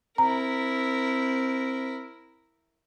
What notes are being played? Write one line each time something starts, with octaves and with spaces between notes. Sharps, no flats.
C4 E4 A#4 A#5